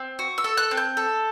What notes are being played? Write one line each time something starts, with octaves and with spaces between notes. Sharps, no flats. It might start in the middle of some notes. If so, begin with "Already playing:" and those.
Already playing: C4
F#4
E6
A4
F#6
C4
G6
A4